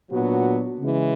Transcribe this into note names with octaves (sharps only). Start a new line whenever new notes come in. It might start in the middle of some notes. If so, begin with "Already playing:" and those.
A#2 F#3 B3 D4 F#4
C#3 E3 G#3